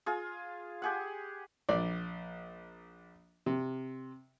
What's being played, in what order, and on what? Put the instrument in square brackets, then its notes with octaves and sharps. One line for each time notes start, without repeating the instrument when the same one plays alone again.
[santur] F4 G#4
G4 G#4 F#5
[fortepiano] A#1 D5
C3